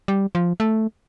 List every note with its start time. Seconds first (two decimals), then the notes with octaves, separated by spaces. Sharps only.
0.08 G3
0.35 F3
0.60 A3